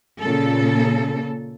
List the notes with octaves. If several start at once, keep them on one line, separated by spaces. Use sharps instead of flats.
A#2 C#3 A4